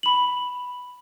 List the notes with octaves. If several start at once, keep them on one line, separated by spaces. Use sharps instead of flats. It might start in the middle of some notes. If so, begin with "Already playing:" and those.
B5 F#7